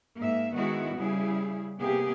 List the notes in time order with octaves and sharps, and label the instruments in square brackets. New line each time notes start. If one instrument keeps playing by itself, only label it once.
[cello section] G#2 A#3 E5
D#3 G#3 B3 E4 F#4
C#3 G3 E4 G#4
C3 A#3 B3 G4 G#4